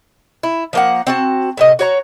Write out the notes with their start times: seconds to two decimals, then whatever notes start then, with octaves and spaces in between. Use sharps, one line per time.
0.43 E4
0.73 F3 A#3 F#5
1.07 C4 F#4 A5
1.57 A2 C3 D#5
1.79 F#4 C#5 A#5